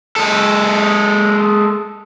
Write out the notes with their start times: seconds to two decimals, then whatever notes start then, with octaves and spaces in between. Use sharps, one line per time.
0.16 G#3 A4